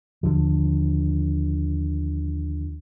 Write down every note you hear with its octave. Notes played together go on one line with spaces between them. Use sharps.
D#2 D3 F3